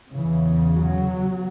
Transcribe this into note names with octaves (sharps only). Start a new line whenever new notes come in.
E2 C#3 E3
F#3